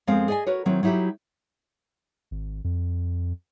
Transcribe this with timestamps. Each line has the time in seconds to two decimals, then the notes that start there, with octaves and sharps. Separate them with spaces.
0.07 F2 G#3 B3 C4 A#4 F5
0.28 G#4 D5 D#5 F#5 G#5
0.46 F#4 A#4 B4 C#5
0.66 D#3 F#3 C4 E4
0.83 F#3 D#4 E4 F#4 G4
2.31 G#1
2.64 F2